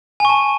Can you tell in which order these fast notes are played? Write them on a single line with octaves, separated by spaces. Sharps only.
G#5 C#6 A5